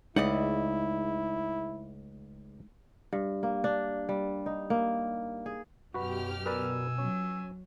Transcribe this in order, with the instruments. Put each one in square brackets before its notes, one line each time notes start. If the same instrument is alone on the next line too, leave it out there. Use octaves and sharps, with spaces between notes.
[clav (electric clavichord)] C#2 F#5 [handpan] G#3 A3 [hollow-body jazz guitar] D#4 D5 D#5 [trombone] E4
[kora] G2
A#3
D4
G3
D#4
A#3
G#4
[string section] F#2 G4 F6 [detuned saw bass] B2 [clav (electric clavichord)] F#4 B4
[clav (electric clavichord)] A#4 B4 D5 [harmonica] G#5 E6
[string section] F#3 [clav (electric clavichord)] C#4